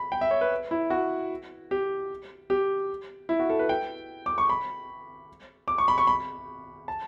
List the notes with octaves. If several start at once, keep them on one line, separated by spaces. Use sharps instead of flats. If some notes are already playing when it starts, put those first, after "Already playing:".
Already playing: B5
G5
E5
C#5
B4
E4
F#4
G4
G4
E4
F#4
A4
B4
G5
D6
C#6
B5
D6
C#6
B5
C#6
B5
A5